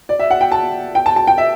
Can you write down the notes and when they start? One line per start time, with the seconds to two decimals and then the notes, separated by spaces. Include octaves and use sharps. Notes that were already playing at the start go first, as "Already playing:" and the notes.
0.09 D5
0.19 E5
0.31 F#5
0.41 G5
0.52 A5
0.95 G5
1.06 A5
1.16 A5
1.28 G5
1.38 E5